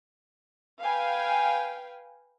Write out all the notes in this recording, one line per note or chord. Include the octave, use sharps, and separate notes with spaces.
B4 F5 G5 G#5